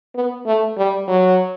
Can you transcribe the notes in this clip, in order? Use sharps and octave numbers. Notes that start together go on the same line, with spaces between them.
B3
A3
G3
F#3